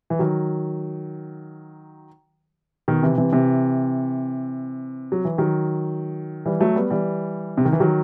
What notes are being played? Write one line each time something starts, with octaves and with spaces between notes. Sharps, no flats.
E3
D#3 F#3
B2 D#3
C3 E3
C3 E3
C3 E3
F#3
E3
D#3 F#3
E3 G3
F#3 A3
G3 B3
E3 G3
C3
D#3
E3
D#3 F#3